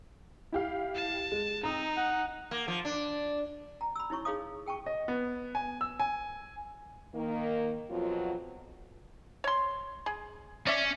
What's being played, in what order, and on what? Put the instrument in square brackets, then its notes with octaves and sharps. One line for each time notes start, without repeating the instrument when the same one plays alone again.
[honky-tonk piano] E4 G4 F5
[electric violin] A5
[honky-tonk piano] G#3
[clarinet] C4 [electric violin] D#4 [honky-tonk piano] A#5 D#6
[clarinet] F#5
[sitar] A#3
F3
D4
[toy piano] A#5
B5 E6
D#4 E4 C#5 C#6
D#4 G#4 C#5 F5 D#6
G#4 G5 A5 C#6
[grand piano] D#5
B3
G#5
E6
G#5
[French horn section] D#3 A#3
F2 B2 F#3 F4
[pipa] C#5 C6
G#4
[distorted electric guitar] C#4 [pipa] D5 E5